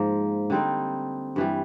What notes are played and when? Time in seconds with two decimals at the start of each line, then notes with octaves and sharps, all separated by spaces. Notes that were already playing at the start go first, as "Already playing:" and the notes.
Already playing: G#2 F3 A#3
0.50 D3 G3 C4 D#4
1.36 G2 E3 G3